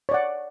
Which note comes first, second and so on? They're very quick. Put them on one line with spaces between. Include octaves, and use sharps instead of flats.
C#5 D5 F#5